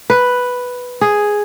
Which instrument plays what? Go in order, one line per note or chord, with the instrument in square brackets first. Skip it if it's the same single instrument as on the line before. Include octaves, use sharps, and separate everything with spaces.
[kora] B4
G#4